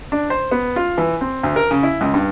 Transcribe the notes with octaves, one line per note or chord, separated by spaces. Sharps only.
D4
C5
B3
F4
E3
C4
D2
A#4
C#3
E4
C#2
G2